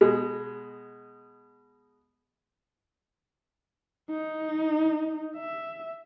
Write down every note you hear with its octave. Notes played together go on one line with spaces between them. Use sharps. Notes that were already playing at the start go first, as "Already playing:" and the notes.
B2 G#3
D#4
E5